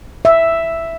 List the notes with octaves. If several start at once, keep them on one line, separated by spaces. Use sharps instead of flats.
E5